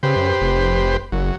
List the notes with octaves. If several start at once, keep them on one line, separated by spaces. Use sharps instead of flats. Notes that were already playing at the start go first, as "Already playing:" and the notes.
C#3 G4 B4 C5
F#2
F1
F#1 F#3